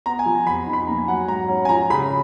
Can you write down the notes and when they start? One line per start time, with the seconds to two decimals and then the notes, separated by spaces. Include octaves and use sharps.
0.06 B3 A#5
0.19 G#5
0.26 F3
0.46 F2 B5
0.66 D#4
0.73 B5
0.87 A#3 A#5
0.98 G#5
1.08 F#3 F#5
1.28 G#2 A#5
1.48 C#4
1.65 G#5
1.69 F3 A#5
1.90 C#3 B5